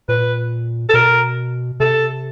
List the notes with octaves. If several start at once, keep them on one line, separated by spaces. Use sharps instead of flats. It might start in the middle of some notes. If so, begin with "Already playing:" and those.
A#2 B4
A4
B2 A#4
C3 A4